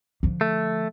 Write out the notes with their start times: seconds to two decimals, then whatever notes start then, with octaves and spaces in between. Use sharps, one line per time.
0.23 D3 F3
0.41 A3